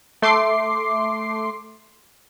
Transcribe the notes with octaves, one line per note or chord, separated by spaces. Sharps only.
A3 C6 D6 C7